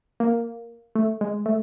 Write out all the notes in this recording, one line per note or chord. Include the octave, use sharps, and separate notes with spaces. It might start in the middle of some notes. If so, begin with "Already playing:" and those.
A#3
A3
G#3
A3